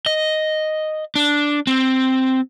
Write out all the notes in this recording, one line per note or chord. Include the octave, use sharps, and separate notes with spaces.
D#5
D4
C4